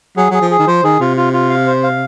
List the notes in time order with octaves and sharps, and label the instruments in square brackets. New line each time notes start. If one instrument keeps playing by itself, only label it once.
[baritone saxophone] F#3 [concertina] G#4
[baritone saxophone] F#3 [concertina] G#4
[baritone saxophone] F3
[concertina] G#4
[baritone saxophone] D#3
[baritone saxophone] F3 [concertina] C5
[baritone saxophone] D#3 [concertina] G#4
[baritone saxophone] C3 [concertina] F4
[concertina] F4
F4
F5
C5
F5